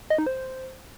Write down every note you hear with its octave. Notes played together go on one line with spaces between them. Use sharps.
D#5
D#4
C5